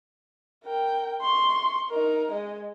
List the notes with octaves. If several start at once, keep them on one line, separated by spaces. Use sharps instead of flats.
A#4 G5
C6 C#6
D#4 A#4
G#3 D#5